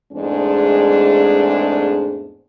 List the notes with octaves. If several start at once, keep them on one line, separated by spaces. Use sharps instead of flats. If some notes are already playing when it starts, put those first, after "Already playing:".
E2 G#2 G#3 A3 C4 D4